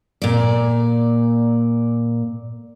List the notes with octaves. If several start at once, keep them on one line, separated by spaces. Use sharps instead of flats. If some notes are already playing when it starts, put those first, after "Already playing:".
A#2 D5